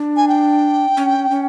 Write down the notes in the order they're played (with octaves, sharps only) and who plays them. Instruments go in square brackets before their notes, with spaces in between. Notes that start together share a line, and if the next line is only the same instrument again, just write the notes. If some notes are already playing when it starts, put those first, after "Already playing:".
Already playing: [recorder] D4
[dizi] G#5
G5
[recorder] C#4
C#4